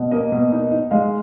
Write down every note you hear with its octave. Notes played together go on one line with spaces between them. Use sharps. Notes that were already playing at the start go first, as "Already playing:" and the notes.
Already playing: B2
A#3 D#5
B2
D#4
D#4
G#3 F5